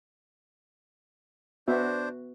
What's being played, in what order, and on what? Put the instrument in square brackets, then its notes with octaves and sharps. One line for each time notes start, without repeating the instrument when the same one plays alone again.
[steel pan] B3 F#4 E5 [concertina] D4 C5